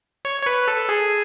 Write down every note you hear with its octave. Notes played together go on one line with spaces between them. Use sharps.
C#5
C#5
B4
A4
G#4